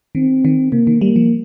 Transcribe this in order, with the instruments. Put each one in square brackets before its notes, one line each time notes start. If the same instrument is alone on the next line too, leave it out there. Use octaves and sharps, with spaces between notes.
[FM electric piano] D#3 [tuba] C4
[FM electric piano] D#3
[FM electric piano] C3 [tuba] A#3
[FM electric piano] D#3
[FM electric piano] G3 [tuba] A#3
[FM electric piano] F3